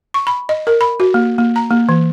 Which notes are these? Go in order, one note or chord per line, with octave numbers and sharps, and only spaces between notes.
C#6
B5
D#5
A#4
B5
F#4
A#3
A#3
A#5
A#3
E3